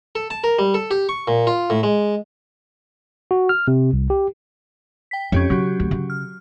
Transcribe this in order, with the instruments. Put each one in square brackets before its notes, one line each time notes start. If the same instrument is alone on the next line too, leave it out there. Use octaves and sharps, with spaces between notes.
[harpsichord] A4
A5
A#4
G3
A4
G4
C#6
A#2
F4
A2
G#3
[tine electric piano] F#4
F6
C3
C2
G4
[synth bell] G5 B6
[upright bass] F2 D#4 [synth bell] C#4 G4 C#5
[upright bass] C#3 [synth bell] F#3 F#4 G4
[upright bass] D2
C#3
[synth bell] F6